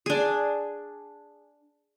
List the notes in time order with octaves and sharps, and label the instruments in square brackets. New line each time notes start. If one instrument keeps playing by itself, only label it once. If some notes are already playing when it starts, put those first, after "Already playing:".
[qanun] D4 G#4